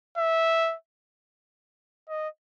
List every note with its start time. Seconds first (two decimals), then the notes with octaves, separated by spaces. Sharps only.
0.18 E5
2.09 D#5